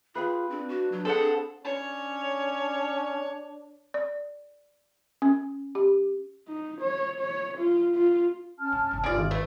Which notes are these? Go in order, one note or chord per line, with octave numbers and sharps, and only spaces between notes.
F4 G#4 B4 F5 G5
C4 D4
F#4
F#3
C4 G#4 A4 F#5
C#4 D4 C#5
D5
C#4
G4
D#4
C#5
C#5
F4
F4
C#4 A5 F6
G2
G1 C2
G1 D3 F4 G#4 D5 F6 D7
G#1
A3 E4 F4 B4